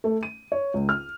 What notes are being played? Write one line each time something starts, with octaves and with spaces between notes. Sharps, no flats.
A3
D#7
C#5
C#2
F6